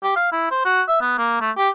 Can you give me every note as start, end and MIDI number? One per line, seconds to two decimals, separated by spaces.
0.03 0.11 67
0.16 0.32 77
0.32 0.50 64
0.51 0.61 72
0.65 0.82 66
0.89 0.97 76
1.01 1.15 59
1.18 1.40 58
1.41 1.51 57
1.57 1.69 67